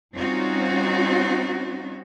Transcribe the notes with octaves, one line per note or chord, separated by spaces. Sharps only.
G3 C4 C#4 D#4 F4 F#4